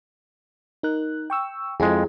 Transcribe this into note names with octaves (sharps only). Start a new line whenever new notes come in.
D#4 A#4 F#6
G5 C#6 E6
F2 G#3 E4 G#4